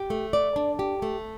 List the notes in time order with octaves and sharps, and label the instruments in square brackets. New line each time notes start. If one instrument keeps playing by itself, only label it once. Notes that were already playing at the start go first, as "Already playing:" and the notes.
Already playing: [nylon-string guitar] G4
A3
D5
D4
G4
A3